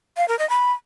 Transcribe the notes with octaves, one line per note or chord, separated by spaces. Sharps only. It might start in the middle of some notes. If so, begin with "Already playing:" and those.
F5
A#4
D#5
B5